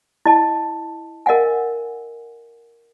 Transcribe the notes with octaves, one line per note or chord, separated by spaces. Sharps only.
E4 D#5 A5
A#4 D#5 F5 F#5 G#5